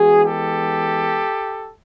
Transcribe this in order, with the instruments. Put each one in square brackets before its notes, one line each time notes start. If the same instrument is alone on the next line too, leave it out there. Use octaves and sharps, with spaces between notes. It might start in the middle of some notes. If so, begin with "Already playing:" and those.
Already playing: [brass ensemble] E3 G#3 B3 F#4 G#4
G4 A4